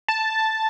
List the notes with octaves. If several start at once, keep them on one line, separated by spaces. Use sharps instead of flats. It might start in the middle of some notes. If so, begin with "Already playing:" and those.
A5